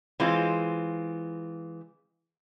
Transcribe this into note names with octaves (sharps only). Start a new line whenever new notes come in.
E3 G#3 C4 F4